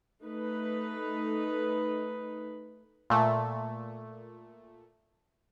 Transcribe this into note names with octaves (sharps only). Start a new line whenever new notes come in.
A3 D#4 B4
A#2 A3